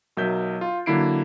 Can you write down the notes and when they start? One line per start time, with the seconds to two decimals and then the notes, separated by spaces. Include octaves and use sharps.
0.17 B1 F#3 A#4 E5 G6
0.61 F4
0.86 D3 F#3 A#3 E4 C7 D7